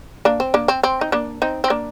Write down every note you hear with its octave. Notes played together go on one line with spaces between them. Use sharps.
A#3 D4
C4
A#3 D4
C4
C4
D#4
A#3 D4
C4 D#4
C4
A#3 D4